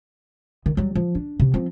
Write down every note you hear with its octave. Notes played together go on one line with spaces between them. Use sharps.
D#3
F#3 G3
F3
D4
C3
F3 C4